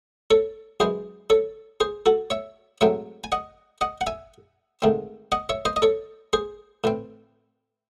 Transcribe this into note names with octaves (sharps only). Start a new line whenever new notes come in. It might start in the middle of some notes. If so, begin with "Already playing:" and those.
A4 C#5
F#2 E3 G#3 G#4 C5
A4 C#5
G#4 C5
F#4 A4
C#5 E5
G#2 F#3 A3 C4 C#5 E5
G#5
D#5 F#5
D#5 F#5
F#5
E5 G#5
G#2 D#3 A3 C4
D#5 F#5
C#5 E5
C5 D#5
D#5
A4 C#5
G#4 C5
A2 E3 C4